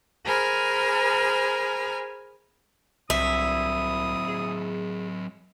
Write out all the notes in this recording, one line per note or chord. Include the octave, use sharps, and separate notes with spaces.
G#4 A#4 C5 G#5 B5 F6
C2 F#3 C4 E4 D#6
G#4